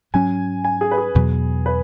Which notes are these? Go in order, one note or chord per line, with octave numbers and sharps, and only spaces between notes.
G#2 F#3 C#4 G#5
G#5
G#4
B4
G#4
E2 B2 F#3
B4